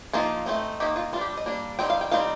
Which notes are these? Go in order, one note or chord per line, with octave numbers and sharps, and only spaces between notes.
F3 A#3 D#4 F4
A3 C4 D#4
D#3 A#3 D#4 G4
F4
G3 D4 F4
G4
D#5
G3 A#3 D4
G3 C4 D#4 G5
F5
G5
G3 C4 D#4 F5